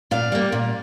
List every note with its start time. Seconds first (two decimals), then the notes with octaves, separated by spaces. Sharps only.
0.11 A#2 D5 F5
0.32 G3 A#3
0.52 A#2